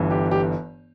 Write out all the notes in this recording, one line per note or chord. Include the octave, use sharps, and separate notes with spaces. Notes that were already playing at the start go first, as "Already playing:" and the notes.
Already playing: G1 G2 E3
G4
G4